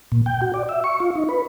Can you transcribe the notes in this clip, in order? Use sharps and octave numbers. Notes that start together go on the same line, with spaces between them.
A#2
G5
F#4
D5
E5
C#6
F4
D#4
B4